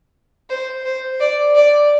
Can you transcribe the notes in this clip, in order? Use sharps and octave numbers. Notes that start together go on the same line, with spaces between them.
C5
C5
D5
D5